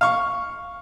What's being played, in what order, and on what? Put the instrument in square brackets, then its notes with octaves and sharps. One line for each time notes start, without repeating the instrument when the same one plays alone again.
[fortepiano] F5 C#6